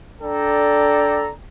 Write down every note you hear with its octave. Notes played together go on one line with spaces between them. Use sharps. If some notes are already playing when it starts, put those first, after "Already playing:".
D4 A4 D5 G5 A#5